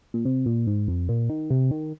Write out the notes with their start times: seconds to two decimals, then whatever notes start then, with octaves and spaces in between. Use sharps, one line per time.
0.14 A#2
0.25 C3
0.46 A#2
0.67 G#2
0.88 F2
1.09 A#2
1.29 D#3
1.50 C3
1.71 D#3